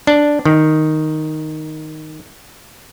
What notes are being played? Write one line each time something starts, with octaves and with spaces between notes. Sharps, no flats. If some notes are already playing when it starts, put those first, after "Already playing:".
D4
D#3